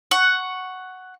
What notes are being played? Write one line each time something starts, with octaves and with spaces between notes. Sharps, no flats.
F#5 C#6